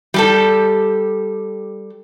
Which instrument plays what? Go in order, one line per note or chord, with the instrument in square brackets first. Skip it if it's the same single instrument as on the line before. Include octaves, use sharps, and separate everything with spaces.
[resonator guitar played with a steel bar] G3 G4 A4